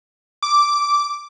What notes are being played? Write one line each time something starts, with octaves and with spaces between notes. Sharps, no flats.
D6